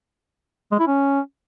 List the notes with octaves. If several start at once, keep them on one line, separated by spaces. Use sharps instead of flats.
G#3
E4
C#4